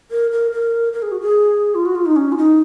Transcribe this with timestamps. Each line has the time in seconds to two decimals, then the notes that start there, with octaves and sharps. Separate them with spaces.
0.11 A#4
0.31 A#4
0.52 A#4
0.93 A#4
1.02 G#4
1.12 F#4
1.21 G#4
1.75 F4
1.86 F#4
1.95 F4
2.06 D#4
2.16 C#4
2.32 F4
2.38 D#4